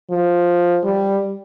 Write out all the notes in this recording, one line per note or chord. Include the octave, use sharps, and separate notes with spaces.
F3
G3